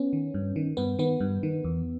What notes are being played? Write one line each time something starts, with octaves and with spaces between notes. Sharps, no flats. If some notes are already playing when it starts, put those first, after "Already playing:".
Already playing: B3 C#4
D#3
G2
D#3
G2 B3
D#3 B3
G2
D#3
E2